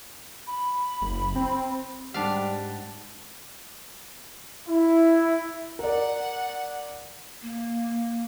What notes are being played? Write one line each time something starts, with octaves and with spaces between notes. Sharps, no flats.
B5
F#1
C4
G#2 G3 D4 F5 F#5 A5 B6
E4
A#4 D5 F#5
A#3